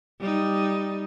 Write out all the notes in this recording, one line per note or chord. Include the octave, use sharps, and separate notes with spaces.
G3 D#4